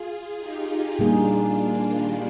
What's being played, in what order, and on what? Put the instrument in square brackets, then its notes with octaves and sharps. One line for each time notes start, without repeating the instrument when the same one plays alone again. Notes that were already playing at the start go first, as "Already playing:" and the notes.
Already playing: [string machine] F4 G#4
D#4 G4
[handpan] A#2 G3 A#3 D#4 G#4 [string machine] D4 F4
[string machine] A#3 D4
D#3 G3